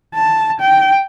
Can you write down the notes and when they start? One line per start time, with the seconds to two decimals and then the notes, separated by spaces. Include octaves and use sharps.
0.15 A5
0.60 G5